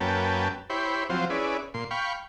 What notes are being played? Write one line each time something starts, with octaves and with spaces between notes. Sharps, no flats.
F#2 A#3 C#4 B4 G5 A5
E4 G4 C5 C#5 B5
F3 F#3 C4 F4 C5
C#4 E4 G#4 B4 D5
A#2 C6
F5 G5 B5 C#6